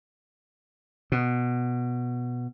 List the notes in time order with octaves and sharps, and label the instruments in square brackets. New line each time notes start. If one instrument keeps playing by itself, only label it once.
[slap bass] B2